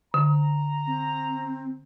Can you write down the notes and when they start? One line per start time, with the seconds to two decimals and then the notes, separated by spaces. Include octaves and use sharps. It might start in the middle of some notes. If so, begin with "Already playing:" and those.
0.14 D3 A#5
0.87 C4